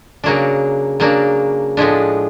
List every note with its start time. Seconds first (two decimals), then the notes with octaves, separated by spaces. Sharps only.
0.24 C#3 F#3 A#3 D4
1.00 C#3 F#3 A#3 D4
1.77 A2 F3 G#3 B3 D4